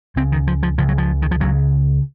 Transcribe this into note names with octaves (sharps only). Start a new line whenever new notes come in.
C#2 C#3 C4
D#3
F3
F3
C#2 C#3 F3
F#3
F3
D#3
F3
C#2 C#3 F#3